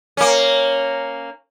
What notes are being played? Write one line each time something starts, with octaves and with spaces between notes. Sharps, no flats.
A#3 C#4